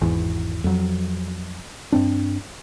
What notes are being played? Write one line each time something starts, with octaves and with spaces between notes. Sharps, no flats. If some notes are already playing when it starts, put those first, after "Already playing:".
G#1 E2 E3
F2 F#3
G2 C4 D4